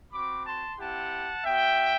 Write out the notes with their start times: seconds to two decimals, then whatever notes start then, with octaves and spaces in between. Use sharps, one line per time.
0.12 C4 F#4 B5 D6
0.46 A5 C6
0.79 C4 E4 G4 F#5 A5
1.44 B3 F#4 E5 G5